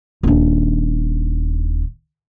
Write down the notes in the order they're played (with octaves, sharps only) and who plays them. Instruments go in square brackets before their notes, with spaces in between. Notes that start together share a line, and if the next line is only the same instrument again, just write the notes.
[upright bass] D#1 D4